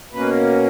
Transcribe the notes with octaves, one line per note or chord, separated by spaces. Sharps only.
B2 A#3 C#4 B4